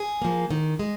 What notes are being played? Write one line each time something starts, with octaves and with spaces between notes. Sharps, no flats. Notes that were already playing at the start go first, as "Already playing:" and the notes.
Already playing: G#4
F3 A#3
D#3
G#3